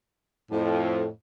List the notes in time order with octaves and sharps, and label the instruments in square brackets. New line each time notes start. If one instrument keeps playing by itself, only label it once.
[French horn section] F2 [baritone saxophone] A2